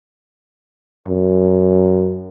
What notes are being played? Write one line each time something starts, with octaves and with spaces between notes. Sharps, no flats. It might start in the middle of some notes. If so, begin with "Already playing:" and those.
F#2